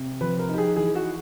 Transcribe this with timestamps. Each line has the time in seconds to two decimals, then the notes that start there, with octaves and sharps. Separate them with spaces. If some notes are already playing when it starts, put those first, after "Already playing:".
Already playing: C3
0.21 F3 B4
0.39 A#4
0.49 D#4 G4
0.58 G#4
0.76 E3 G#4
0.95 F#4